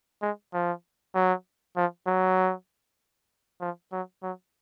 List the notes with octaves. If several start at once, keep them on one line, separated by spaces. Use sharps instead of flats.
G#3
F3
F#3
F3
F#3
F3
F#3
F#3